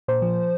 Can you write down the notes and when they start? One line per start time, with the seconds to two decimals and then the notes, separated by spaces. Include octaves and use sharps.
0.08 A#2 C5
0.22 F3